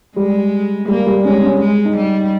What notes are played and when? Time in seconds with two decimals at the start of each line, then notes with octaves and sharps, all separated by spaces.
0.16 G3 G#3
0.88 G3 A#3
1.07 G3
1.24 G#3 C#4
1.43 C#4
1.61 G#3
1.85 D#4
1.97 G3